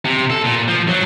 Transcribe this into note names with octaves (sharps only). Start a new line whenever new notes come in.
C3
A4
A#2
F3
F#3